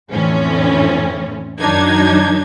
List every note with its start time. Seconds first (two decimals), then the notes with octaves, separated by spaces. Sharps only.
0.12 F2 A2 D3 E3 C4 C#4
1.59 F#2 D#3 F#3 D4 D#4 G#6